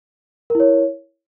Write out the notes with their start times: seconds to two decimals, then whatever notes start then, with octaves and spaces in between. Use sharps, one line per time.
0.50 A#4
0.55 E4
0.60 C#5